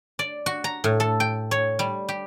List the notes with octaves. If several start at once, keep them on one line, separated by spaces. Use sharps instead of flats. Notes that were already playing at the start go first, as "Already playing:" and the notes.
D5
F#4
A#5
A2
A4
G5
C#5
G3
G4